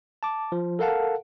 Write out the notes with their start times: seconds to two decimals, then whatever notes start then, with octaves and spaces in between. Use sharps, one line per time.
0.23 A5 D6
0.52 F3
0.79 A4 A#4 F5 F#5 A5